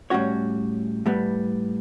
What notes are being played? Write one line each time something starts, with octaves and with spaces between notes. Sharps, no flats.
A2 G3 C#4 F#4 C#5
A2 G3 B3